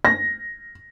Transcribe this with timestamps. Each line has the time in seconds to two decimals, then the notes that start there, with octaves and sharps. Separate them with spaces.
0.05 A#6